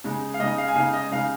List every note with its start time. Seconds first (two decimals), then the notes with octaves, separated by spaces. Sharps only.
0.04 C#3 G#3 D#4
0.34 F5
0.40 C#3 G#3 D#4 D#5
0.58 F5
0.68 G#5
0.76 C#3 G#3 D#4 F5
0.93 D#5
1.11 C#3 G#3 D#4 F5